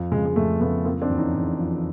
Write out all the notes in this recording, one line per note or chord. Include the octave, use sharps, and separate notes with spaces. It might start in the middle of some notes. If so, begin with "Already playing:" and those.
Already playing: F2 F3
C#3 G#3
G#3
F2 A3
C#3 A3 B3
F3 A#3 C4
C4 D4
E2
C#4 D#4
E2
F3